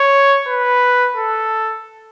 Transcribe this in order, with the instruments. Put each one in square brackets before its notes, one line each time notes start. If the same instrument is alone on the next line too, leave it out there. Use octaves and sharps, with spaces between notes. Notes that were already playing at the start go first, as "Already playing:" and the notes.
Already playing: [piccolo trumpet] C#5
B4
A4